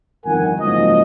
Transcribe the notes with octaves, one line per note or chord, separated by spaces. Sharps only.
G1 F2 D#3 A#4 F#5 G#5
F#1 G#2 F3 F#3 D#5